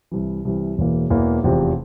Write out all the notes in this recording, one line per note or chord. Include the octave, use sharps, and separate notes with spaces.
C2 C3 E3
C2 C3 E3
E1 E2 E3 A#3
E1 E2 E3 A#3
F1 E2 C3 F3